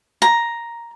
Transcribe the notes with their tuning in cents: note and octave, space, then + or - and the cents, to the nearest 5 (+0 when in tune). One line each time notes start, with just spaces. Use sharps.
A#5 +5